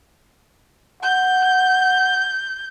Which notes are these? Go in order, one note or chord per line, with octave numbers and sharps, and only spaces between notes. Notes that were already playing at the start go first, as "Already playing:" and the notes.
F#5 G6